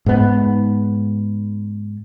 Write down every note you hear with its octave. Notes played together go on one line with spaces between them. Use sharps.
G#2 B3